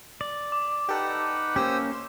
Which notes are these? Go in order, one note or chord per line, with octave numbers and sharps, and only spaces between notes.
D5
D6
D#4 G4 A4 B4 F#5
A#3 C#4 G4 C5 D#6 E6
C6